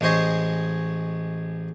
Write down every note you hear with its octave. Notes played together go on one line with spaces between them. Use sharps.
A1 G#3 C5 C#5 D#5